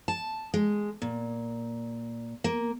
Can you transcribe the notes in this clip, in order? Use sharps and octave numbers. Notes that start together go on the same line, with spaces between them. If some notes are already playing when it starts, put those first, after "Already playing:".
A5
G#3
A#2
A#3